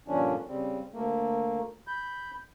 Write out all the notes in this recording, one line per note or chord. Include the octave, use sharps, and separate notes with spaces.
G2 A#2 D3 F3 C#4 D4
C#3 G3 C4
D2 A3 A#3
B5 G6